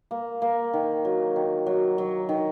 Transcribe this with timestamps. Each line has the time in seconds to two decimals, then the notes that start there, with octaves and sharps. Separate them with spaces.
0.11 A#3
0.42 A#3
0.73 D#3
1.05 F#3
1.36 D#3
1.66 F#3
1.98 F#3
2.29 D#3